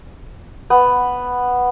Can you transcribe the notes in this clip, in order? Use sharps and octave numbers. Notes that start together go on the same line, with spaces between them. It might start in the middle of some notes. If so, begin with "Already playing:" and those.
B3